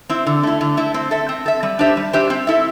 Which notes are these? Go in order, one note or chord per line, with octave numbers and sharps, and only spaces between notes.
C4 E4
D3
A3 E4
D3
A3 E4
C4
A4 E5
C4
A4 E5
G3
D4 G4 C5 E5
G3
D4 G4 C5 E5
C4
E4 A4 E5